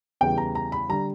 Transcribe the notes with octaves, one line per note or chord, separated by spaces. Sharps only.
E2 C#3 E3 G3 G5
A#5
A#5
B5
D3 G3 A#5